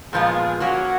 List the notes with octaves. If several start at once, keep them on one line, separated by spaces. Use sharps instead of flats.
A#2 F3 G#3 B3 F4 G#4
F#3 A#3 C#4 F#4